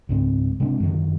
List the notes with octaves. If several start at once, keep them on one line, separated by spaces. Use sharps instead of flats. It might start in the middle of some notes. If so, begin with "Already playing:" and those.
C#2 G#2 C4
C3 G#3 C4 D4
F#2 D3 D#3 F#3